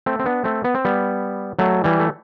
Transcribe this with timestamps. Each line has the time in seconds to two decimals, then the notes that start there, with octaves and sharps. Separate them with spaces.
0.06 A3 C4
0.19 C4
0.26 B3 D4
0.44 A3 C4
0.64 B3
0.74 C4
0.85 G3 B3
1.59 F#3 A3
1.84 E3 G3
2.00 A3